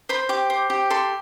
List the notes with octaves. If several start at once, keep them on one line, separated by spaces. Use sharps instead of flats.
C5 B5
G4 D6
C5
G4
A4 C6